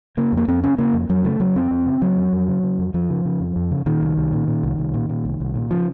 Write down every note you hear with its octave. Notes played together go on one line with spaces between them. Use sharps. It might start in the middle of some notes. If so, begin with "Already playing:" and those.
C#3 A#3
F2
A#3
F2 C4
C#3 C#4
C#3 A#3
F2
F2 F#3
C#3 A3
C#3 F#3
F2 C4
F2
C#3
C#3 F#3
F2
F2
C#3
C#3
F2
F2 F3
C#3
C#3
F2
F2
C#3
A#2 D#3
C2
C2
A#2
A#2
C2
C2
A#2
A#2
C2
C2
A#2
C#3 F3